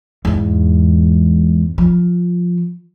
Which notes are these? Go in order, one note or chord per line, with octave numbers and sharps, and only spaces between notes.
E2 G#2
F3